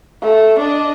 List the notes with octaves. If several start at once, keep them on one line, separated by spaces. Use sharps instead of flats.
A3
D4 D#5